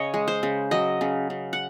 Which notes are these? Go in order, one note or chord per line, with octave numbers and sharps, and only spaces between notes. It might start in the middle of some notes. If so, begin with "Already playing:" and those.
Already playing: C#3 C#5 D#5
G#3
C5
C#3
F#3 D#5
C#3
C#3
F#5